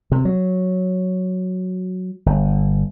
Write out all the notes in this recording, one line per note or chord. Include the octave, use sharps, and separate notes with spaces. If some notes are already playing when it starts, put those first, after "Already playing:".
C3
F#3
G1